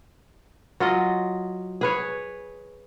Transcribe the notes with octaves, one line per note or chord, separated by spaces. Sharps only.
F#3 F4 D#5
G#4 B4 C#5